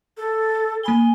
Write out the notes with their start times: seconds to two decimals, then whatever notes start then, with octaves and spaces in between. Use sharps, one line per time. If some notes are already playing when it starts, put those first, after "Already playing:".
0.17 A4
0.83 A#3 G#5 B5 G7